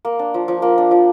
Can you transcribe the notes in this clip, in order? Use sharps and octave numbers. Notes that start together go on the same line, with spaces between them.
A#3
D4
F3
F3
A#3
D4
F3